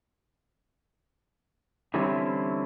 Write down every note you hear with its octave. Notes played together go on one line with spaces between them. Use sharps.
D3 E3 G3 C4 C#4 E4